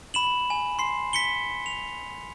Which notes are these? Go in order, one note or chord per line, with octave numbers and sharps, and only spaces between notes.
B5 E7 F#7
G#5
C6 C7
B6 C#7 G7
F7